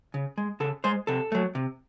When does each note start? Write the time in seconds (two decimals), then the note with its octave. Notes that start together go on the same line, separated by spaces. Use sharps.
0.14 C#3
0.38 G#3
0.60 C#3 A4
0.84 G#3 C5
1.07 C3 A4
1.32 F#3 A3
1.55 C3